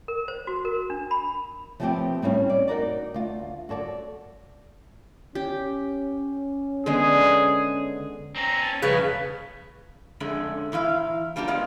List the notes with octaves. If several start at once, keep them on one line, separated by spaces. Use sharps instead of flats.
A#4
C5
F#4
A#4
D4
B5
F3 G3 A3 B3 C4 G4
A2 G3 C4 C#4
D5
D#4 F#4 A#4 D5
D2 F4
F#4 A4 C#5 D5
C#4 G4
D3 G#3 B3 G#4
C4 C#4 A#5
A5
C2 F2 C#3 C#4 B4
F2 D3 G#3 A3 C#4
A#2 E3 E4 F5
G3 A#3 D4 F4 G4
G#3 B3 G#4 D5 F5